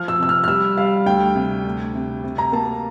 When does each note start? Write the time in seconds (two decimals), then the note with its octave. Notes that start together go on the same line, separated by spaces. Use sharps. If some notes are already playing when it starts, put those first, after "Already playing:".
Already playing: F3 F6
0.08 E6
0.19 C3 E6
0.29 F6
0.44 F6
0.48 G3 E6
0.77 G3 F5
1.06 D2 G5
1.35 C3
1.65 D2
1.95 C3
2.24 C3
2.38 A#5
2.52 A#3 A5